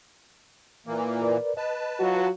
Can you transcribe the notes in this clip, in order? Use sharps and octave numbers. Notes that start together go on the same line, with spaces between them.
A#2 E3 A#3
A#4 B4 D5
B4 D#5 A5
F#3 F4 F#4